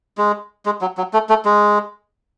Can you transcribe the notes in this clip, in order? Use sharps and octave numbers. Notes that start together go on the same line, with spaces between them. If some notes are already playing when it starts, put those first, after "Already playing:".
G#3
G#3
F#3
F#3
A3
A3
G#3